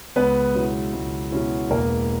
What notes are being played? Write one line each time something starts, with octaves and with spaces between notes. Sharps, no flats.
C#2 B3 B4
B2 F#3 C#4 E4
C#2
B2 F#3 C#4 E4
E1 A#3 A#4